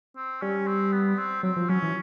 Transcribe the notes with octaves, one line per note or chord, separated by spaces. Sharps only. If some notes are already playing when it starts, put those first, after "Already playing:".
C4
G3 C#4
C4
B3
C4
F#3 C4
F3
F#3 C#4
E3